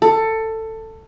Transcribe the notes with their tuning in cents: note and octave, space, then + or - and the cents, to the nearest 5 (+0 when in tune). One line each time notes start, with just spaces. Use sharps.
A4 +15